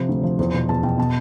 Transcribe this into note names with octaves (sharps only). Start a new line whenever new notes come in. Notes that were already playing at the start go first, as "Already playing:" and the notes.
Already playing: C3 F3 C5
D2
F3
E2 C5
B2 C5
E2 A5
B2 G5
B2 A5